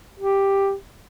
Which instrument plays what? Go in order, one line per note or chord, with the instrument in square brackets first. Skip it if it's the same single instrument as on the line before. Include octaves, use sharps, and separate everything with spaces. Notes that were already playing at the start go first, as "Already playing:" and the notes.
[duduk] G4